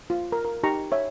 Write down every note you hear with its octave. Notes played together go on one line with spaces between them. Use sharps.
F4
A#4
A#4
D#4 G4 A#5 C#6
C#5 E5